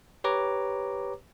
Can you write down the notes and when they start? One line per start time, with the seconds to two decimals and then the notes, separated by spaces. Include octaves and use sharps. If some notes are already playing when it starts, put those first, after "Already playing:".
0.24 G4 B4 C#5 A#5 D6